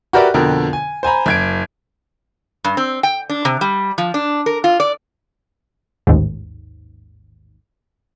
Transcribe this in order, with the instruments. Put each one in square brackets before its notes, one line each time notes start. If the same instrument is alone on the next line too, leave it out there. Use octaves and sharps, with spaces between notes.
[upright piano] F#4 G4 A#4 B4 D5 E5
F2 B2 D3 A#4 G5
G#5
C5 G#5 A#5 B5
F#1 G#6 D7
[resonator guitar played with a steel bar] G2
C4
G5
D4
C3
G3
F3
D4
A#4
F4
D5
[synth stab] A1 D#2 G#2